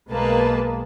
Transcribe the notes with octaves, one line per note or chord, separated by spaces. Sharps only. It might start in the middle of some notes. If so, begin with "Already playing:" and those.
B1 G#3 A#3 B4 A5